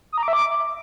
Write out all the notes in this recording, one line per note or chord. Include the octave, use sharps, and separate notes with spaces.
D#6
A#5
D6
E5
D6